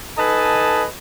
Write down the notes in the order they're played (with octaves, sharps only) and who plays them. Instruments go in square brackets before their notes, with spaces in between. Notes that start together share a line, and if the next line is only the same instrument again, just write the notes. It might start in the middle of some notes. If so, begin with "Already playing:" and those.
[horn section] D#4 A4 B4 D#5 G#5 A5